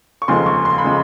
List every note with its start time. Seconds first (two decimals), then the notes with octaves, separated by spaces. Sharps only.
0.22 C#6
0.28 F1 D#2 C#3 F3 G#3 C6
0.46 C#6
0.65 C6
0.78 B5
0.84 C#3 F3 G#3